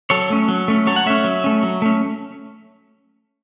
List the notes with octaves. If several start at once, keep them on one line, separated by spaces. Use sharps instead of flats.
F#3 A4 C#5
A3 C#4
F#3
A3 C#4
F#3 A4 C#5
F#5
A3 C#4 C#5 E5
F#3
A3 C#4
F#3
A3 C#4